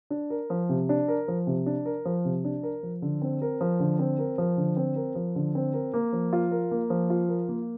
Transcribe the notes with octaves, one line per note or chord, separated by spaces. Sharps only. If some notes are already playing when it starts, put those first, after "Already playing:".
D4
A#4
F3
C3
D4
A#4
F3
C3
D4
A#4
F3
C3
D4
A#4
F3
D3
C4
A#4
F3
D3
C4
A#4
F3
D3
C4
A#4
F3
D3
C4
A#4
A#3
F3
F4
A#4
A#3
F3
F4
A#4
A#3